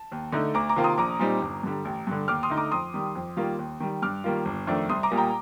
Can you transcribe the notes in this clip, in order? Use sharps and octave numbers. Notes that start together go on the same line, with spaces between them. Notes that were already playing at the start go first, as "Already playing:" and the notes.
Already playing: A5
D#2
D3 A3 D#4
D2 A#5 D6
A#5 D6
C3 D#3 A#3 F4
C6 D#6
A#1 A#5 D6
A#2 G3 C4 D#4
G1
G2 D3 G3
A1
G2 D3
D#2 D6 F6
C6 D#6
D3 A3 D#4
A#5 D6
F2 C6 D#6
D#3 G3
F2
D#3 G3 A#3 F4
D#2
D#3 G3
G2 D6 F6
D#3 G3 A#3 F4
G1
F2 D#3 A3 D4
C2 C6 D#6
A#5 D6
A#2 G3 A#3
G5 A#5